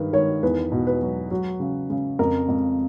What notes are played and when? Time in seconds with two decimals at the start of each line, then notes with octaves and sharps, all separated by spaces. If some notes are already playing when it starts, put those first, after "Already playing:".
Already playing: G2 D#3 B4
0.13 D#3 C#5
0.43 E2 B4
0.72 B2
0.87 B4
1.02 F#3
1.31 F#3
1.60 C#3
1.90 C#3
2.19 F2 A#4
2.48 F2